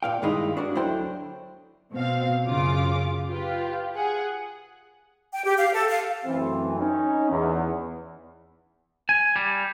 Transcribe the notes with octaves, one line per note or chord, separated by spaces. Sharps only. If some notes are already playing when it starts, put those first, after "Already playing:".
A#2 F5 G5
G2 D#3 G#3 A#3 D#4 E4
D4 F#4 A4 A#4
D2 D3 F#3 E4 C5 G5
B2 C4 F5
F#2 C#3 F4 D6
F4 G4 B4
G#4 F#5
G5
G4
F5
A4
F5
F#2 E3 A3 C4
C#4 D#4
E2
G#5
G3